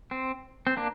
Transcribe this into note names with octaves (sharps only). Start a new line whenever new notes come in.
C4
C4
A#3 D4